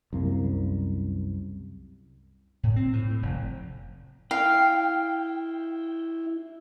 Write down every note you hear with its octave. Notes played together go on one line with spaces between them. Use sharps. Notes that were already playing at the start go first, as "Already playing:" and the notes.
C2 F#2 A#3
A2
C4
A2
A2
F1
E4 F5 G5